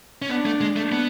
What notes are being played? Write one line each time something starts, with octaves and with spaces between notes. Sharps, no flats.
C#4
B3 D4
A3
G#3
A3
B3